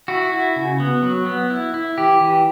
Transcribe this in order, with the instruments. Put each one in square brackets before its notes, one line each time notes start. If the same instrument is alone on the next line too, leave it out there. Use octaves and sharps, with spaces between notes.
[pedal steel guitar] E4 F#4
E4
C#3
B3
F#3
B3
E4
E4
E3 G4
E3